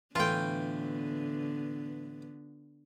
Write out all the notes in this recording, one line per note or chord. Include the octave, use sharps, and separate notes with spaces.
A2 D3 E3 B3 F4 G5